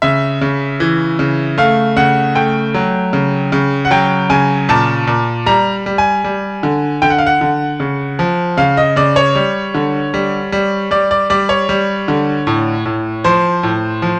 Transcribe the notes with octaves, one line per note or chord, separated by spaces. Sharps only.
C#3 E5
C#3
E3
C#3
A3 F5
C#3 F#5
A3 G5
F#3
C#3
C#3
F#5
F#3 G5
C#3 G#5
A#2 A5
A#2
G3 A#5
G3
G#5
G3
D3
D3 G5
F#5
F5
F#5
D3
C#3
F3
C#3 F5
D#5
C#3 D5
C#5
G3
D3
G3
G3
G3 D5
D5
G3 D5
C#5
G3
D3
A2
A2
F3 C5
A2
F3